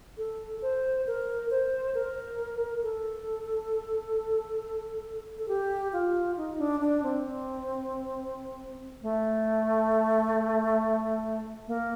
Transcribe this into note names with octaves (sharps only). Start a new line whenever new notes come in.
A4
C5
A#4
C5
A#4
A4
A4
G4
F4
D#4
D4
D4
C4
A3
A#3